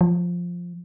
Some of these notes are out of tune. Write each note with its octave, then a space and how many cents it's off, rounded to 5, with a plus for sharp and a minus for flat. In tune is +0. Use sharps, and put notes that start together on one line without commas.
F3 +5